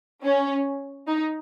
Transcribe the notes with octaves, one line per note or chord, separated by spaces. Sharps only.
C#4
D#4